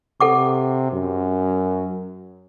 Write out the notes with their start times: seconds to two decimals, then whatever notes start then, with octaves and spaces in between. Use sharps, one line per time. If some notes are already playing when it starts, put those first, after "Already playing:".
0.21 C3 A4 F#5 D6
0.92 F#2